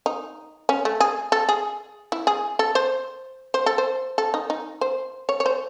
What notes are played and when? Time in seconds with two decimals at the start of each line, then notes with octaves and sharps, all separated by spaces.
0.06 D#4
0.69 C#4
0.85 A3
1.00 G#4
1.32 A4
1.49 G#4
2.12 E4
2.27 G#4
2.59 A4
2.75 C5
3.54 C5
3.66 A4
3.78 C5
4.18 A4
4.34 D#4
4.50 D#4
4.81 C5
5.29 C#5
5.40 C#5
5.46 C5